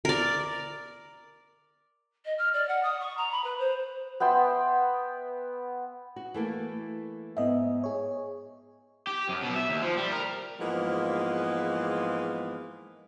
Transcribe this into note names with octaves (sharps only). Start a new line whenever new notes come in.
A#4 D5
D#5
F6
D5
F#5
D#6
C#6
A#5
B5
B4
C5
B3 E5 G5 C6
F#4
E3 A3 A#3
G#2 B3 D#5 E5
G#4 C#5
G4
F#2
B2
E5
D#2
F3
G3
A#4
G#2 E3 F3 G#3 A#3 B3